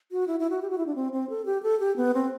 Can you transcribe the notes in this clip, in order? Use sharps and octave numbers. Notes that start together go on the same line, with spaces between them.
F#4
E4
E4
F#4
G4
F#4
E4
D4
C4
C4
A4
G4
A4
G4
B3
C4